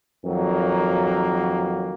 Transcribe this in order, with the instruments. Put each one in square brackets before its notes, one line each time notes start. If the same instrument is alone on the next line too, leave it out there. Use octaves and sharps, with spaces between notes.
[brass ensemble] F2 D#3 F#3 A#3